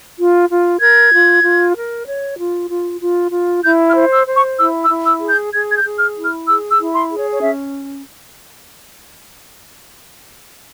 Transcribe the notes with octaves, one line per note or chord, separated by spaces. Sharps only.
F4
F4
A#4 G#6
F4
F4
A#4
C#5
F4
F4
F4
F4
E4 G6
F6
C5
E6
C5
C#6
E4 E6
E6
E4
E6
G#4
G6
G#4 G#6
G#6
G6
G#4
F6
E4
F6
G#4 E6
E6
E4
C6
G#4
C#5
C#5
C#4 E5